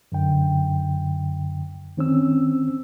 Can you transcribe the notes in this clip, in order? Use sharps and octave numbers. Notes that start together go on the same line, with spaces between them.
F#2 D3 G5
D#3 C4 C#4 E6